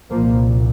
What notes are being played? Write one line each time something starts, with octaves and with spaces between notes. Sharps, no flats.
C2 A#2 F3 A#3